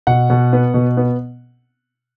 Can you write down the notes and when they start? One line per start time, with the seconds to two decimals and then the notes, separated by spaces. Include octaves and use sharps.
0.07 B2 F#5
0.30 B2
0.53 B3
0.74 B2
0.97 B3